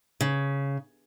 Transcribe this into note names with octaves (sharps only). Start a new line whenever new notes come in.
C#3